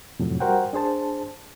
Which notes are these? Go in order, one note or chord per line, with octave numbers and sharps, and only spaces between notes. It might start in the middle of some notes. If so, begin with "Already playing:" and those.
F2 A2 C3 F#3
G3 F#4 A#4 C5 F#5 G5
D4 G#4 C5 A5